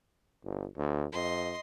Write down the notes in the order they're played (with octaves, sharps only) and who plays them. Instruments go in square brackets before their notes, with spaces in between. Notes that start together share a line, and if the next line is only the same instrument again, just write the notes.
[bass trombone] G1
D2
[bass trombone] F2 [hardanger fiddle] D#5 C6